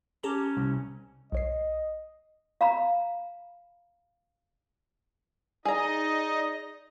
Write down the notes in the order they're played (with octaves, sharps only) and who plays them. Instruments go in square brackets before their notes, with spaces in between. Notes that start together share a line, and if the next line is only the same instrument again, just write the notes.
[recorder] C#4 [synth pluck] G4 A5 A#5
[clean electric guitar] C2
[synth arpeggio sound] B1 C#5 C7 [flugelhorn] D#5
[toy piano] F5 A#5 B5
[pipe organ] D#4 D#5 [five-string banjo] G#4 A#5 [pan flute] D5